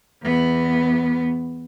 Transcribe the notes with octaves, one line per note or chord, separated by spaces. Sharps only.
E2 B3